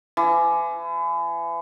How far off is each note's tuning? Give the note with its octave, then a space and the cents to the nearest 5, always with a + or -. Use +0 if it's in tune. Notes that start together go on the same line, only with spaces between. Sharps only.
E3 +35